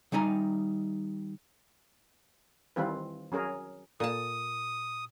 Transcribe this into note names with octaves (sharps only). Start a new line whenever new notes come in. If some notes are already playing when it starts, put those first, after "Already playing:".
D#3 G3 D#4 G#5 A#5
D#3 E3 G3 C4 F4 B4
F#3 C#4 G#4 A#4
A#2 A5 D#6